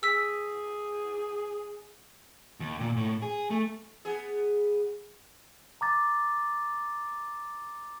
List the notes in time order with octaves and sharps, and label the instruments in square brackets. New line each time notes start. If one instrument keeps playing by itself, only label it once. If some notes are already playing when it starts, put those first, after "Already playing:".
[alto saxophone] G#4 [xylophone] E6 B6
[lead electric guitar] D#2
A#2
A2
G#4
A3
[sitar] B3 G#4
[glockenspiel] A#5 D6 A6